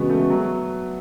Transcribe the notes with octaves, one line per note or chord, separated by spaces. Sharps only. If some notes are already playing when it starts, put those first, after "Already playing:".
Already playing: C#3 E3 G#3 B3 C#4 F#4
A3
F#3